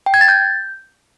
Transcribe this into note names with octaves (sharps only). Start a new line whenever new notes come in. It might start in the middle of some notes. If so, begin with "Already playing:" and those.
G5
G#6
A6
G6